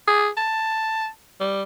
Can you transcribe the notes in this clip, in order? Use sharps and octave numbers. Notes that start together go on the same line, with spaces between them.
G#4
A5
G3